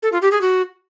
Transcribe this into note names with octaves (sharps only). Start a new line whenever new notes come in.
A4
F4
G4
G#4
F#4